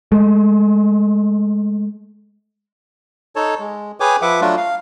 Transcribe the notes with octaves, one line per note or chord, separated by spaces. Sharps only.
G#3 A3
D#4 A4 C#5 A5
G#3
G#4 B4 C#5 G5 G#5 D6
F3 B4 E5 F#5 D6
F#3 A3 D4 F4 F#4
F5